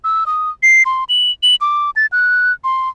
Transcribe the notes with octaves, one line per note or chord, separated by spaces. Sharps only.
E6
D#6
C7
C6
F#7
F#7
D6
A6
F#6
C6